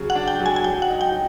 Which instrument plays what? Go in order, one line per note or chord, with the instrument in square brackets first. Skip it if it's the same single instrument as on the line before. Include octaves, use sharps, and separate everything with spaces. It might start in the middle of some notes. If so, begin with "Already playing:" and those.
Already playing: [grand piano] C#3 F#3
[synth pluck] F#5
[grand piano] D4
[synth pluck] G5
[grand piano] F#3
[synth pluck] G#5
G#5
[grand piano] F#3 [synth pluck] G5
[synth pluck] F#5
[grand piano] D#4
[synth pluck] G5
[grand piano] F#3